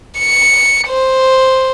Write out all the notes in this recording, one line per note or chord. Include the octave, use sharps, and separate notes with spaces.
C#7
C5